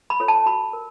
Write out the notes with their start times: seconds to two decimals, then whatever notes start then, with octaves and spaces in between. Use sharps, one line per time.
0.10 B5
0.20 F4 A4 C#5
0.28 A5
0.46 F#4 B5
0.73 A#4